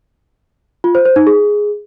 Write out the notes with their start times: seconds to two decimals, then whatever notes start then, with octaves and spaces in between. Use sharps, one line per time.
0.84 F4
0.95 C5
1.05 C5
1.16 D#4
1.27 G#4